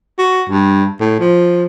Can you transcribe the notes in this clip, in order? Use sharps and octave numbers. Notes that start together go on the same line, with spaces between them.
F#4
G2
A2
F3